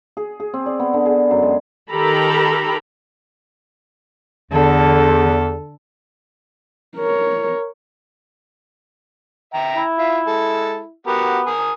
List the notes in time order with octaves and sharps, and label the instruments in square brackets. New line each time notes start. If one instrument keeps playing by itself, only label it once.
[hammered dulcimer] G#4
G#4
C4
D5
B3
D3
G#4
F#2
G#3
[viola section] D#3 G4 A4 A#4 A#5 B5
[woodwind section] E2 [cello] D3 [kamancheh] A4
[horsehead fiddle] A#4 C#5
[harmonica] E5 G5 A#5
[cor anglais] E4
[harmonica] F4 E5
G#3 A4
[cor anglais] B3 [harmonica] F#4 G4 A#4
[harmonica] A#4 G#5 D#6